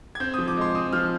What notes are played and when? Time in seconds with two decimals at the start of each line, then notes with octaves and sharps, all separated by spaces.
0.15 G#6
0.20 C4 G6
0.34 F3 D#6
0.48 D6
0.57 G#3 C6
0.75 C4 D#6
0.93 F3 F6